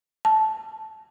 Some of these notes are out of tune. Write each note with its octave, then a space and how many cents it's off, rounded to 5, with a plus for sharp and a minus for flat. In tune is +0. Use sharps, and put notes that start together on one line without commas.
A5 -10